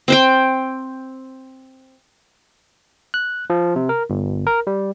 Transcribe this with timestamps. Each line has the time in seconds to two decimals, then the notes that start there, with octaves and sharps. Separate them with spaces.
0.08 C4 C5 G5
3.14 F#6
3.50 F3
3.76 C3
3.89 A#4
4.10 G1
4.47 A#4
4.67 G3